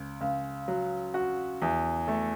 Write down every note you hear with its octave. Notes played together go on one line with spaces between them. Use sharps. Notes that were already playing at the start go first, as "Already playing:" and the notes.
Already playing: C#2
C#2
F#3
F#4
E2
A3